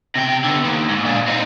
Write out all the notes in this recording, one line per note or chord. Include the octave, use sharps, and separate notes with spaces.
C3 G5
D3 B3
D#3 A#3
G#2
A#2 D4
C4 D#4